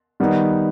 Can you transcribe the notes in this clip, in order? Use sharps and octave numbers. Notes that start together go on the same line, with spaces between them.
D#3 G3 B3 D#4